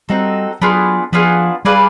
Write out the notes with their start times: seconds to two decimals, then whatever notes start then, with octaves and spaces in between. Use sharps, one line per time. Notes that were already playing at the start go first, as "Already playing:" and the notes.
0.09 G3 C4 D#4 F#4 A4
0.61 F#3 B3 D4 F4 G#4
1.12 F3 B3 D4 F4 G#4
1.65 G3 G#4 B4 D5 F5